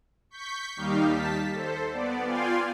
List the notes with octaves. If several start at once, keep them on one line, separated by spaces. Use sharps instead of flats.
C#6 G6 B6
D#2 G3 D#4 G4 F5
A5 B6
A4 C5
B3 D5
F4 D5 F5 G5 G#5 C6